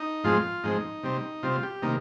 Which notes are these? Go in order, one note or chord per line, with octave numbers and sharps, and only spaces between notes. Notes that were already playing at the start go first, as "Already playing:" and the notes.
Already playing: D#4
G#2 F3 G#3 C4 F4
G#2 F3 G#3 C4 D#4
C3 G3 C4
C3 G3 C4 F4
G4
C3 D#3 G3 A#3 D#4